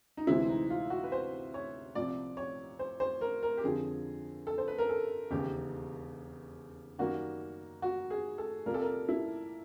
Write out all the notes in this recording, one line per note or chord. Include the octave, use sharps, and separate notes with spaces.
D#4
D2 C3 E3 G#3 C4 E4
D#4
F4
F#4
B4
C5
C#5
C2 A#2 F3 D5
C#5
C5
C5
A#4
A#4
G4
F2 D3 F3 G#4
A4
C5
B4
A#4
A4
E1 D#2 C#3 G4
F#2 D#3 G3 A#3 F#4
F#4
G#4
A4
C2 A#2 G3 A#3 A#4
A4
A#4
E4